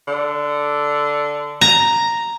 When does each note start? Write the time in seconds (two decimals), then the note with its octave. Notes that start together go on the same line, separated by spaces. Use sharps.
0.08 D3
1.61 A#5